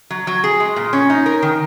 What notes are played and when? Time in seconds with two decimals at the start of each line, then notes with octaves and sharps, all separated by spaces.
0.10 F#3
0.27 F#3
0.44 G#4
0.60 G#3
0.76 A#2
0.93 C#4
1.10 D#4
1.26 A#4
1.42 D#3